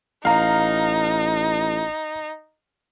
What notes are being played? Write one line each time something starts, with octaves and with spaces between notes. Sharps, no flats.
A1 D#4 F5 A#5